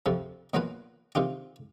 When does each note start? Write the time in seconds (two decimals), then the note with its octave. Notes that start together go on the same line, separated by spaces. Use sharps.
0.06 F2 C3 F3
0.54 B2 F#3 A#3 F4 B4 G#5
1.15 C3 D#3 F4 G4